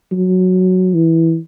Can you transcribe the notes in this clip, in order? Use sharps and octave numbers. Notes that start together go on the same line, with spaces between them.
F#3
E3